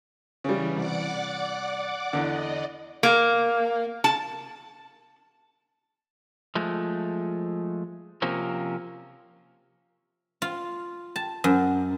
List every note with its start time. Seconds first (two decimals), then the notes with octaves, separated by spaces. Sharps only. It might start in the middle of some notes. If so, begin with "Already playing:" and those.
0.44 C#3 E3 G3
0.76 C2 D5 F#5 D6
2.13 E2 D3 D5 D#5
3.03 A#3
4.04 A5
6.55 F3 G#3 A3
8.22 C3 F3 A#3 C4 C#4
10.42 F4
11.16 A5
11.44 F#2